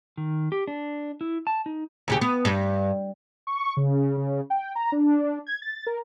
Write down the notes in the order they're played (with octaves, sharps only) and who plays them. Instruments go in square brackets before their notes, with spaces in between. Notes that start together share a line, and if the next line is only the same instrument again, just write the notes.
[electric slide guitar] D#3
G4
D4
E4
A5
D#4
[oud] D#2 C#3 G4
B3
G2
[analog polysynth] C#6
C#3
C#3
G5
A#5
D4
G#6
A6
A#4